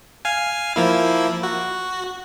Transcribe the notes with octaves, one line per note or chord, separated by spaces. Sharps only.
F5 G#5
F3 A#3 E4
F#4